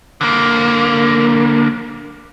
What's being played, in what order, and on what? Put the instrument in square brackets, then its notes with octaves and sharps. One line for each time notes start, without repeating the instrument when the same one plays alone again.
[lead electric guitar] D3 A#3